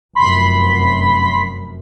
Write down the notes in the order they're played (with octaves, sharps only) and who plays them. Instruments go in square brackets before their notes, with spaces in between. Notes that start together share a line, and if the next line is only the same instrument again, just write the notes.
[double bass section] F1 F#2 [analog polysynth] B5 C6 B6